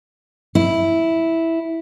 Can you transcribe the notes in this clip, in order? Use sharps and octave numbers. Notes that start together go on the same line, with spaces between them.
E4